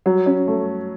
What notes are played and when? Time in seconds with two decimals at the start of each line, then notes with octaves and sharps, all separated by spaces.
0.06 F#3
0.26 C#4
0.48 A3